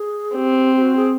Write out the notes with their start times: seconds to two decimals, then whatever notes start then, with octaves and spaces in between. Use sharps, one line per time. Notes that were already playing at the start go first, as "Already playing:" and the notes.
Already playing: G#4
0.35 C4 G4
0.76 G4
0.81 F#4
0.96 G#4